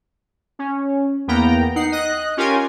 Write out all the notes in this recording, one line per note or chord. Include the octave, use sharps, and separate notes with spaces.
C#4
E2 A#3 B3 G5 A#5
D#4 F#5 C7
D#5 F#6
C#4 F4 G4 A#4 G#5